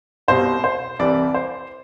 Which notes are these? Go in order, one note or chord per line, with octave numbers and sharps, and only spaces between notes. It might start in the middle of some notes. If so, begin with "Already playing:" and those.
C2 B2 G3 C5
C5
C2 C3 E3 G3 D5
C5